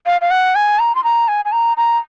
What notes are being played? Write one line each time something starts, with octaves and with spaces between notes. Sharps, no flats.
F5
F5
F#5
G#5
A#5
C6
A#5
G#5
G#5
A#5
A#5